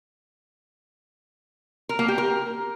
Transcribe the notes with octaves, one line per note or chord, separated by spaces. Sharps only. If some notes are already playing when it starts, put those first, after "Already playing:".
A#4
A#3
G4
A#4